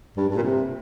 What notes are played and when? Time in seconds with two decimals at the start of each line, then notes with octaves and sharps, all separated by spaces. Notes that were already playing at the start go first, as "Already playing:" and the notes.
0.17 G2
0.29 G2
0.36 A#2
0.43 C3